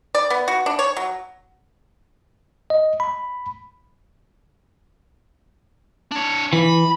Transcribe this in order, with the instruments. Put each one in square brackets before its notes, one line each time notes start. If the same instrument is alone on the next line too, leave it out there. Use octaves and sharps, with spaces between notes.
[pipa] D5
B3
F#4
D4
C#5
F#3
[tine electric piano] D#5
B5
[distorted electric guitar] D4 C#5
[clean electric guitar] E3 [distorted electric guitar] B5